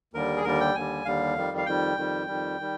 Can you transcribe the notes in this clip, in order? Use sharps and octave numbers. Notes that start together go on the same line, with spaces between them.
D#2 D3 G3 A#4
G#4
D#2 D3 G3 A#4
G5
D#2 D3 G3 G#5
D#2 D3 G3 F5
F2 D#3 G3
F5
F2 D#3 G3 G5
F2 D#3 G3
F2 D#3 G3
D#3 G3